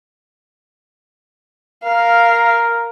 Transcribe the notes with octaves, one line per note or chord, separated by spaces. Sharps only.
A#4 F5